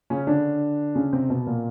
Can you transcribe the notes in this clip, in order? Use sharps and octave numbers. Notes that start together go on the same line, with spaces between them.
C#3 C#4
D3 D4
C#3 C#4
C3 C4
B2 B3
A#2 A#3